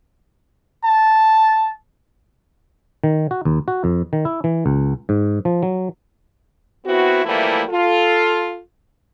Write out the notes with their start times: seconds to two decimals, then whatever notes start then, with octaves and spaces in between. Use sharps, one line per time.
0.84 A5
3.04 D#3
3.31 F#4
3.45 D#2
3.68 F#4
3.84 F2
4.13 D#3
4.25 E4
4.44 E3
4.66 C#2
5.09 G#2
5.45 F3
5.63 F#3
6.86 B3 C4 E4 F#4
7.26 E3 F3 G3 A3 A#3 E4
7.70 F4 A4